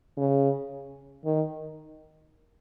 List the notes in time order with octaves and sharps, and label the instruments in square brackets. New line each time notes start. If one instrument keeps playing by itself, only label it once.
[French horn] C#3
D#3